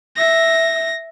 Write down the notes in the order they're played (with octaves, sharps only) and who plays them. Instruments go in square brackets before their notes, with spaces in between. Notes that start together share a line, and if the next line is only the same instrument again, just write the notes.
[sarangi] E5 [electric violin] A#6